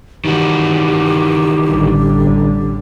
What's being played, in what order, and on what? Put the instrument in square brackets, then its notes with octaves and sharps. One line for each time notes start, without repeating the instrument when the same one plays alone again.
[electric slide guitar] D#3 E3 F#4 [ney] G4
[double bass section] A1 D3 G3